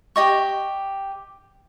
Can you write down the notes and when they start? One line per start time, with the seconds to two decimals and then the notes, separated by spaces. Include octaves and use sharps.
0.16 G4 D#5 C#6